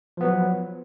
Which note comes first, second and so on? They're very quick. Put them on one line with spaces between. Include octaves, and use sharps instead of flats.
F3 B3 F#3